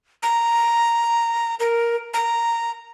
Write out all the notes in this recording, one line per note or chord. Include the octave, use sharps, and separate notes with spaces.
A#5
A#4
A#5